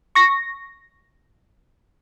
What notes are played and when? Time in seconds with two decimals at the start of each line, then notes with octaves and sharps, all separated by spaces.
0.15 C#6 A#6